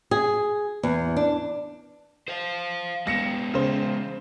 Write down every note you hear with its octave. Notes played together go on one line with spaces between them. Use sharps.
G#4
E2
D4
C5 F5
G#3 B3 A#6 C#7 E7
C#3 C5